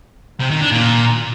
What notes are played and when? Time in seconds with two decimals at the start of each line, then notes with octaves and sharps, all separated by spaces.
0.40 C3
0.51 D#3
0.61 D4
0.72 A#2